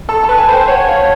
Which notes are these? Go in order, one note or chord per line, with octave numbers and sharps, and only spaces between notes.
A4 A5
A5
B4
G#5
C5 G5
C#5 F#5
F5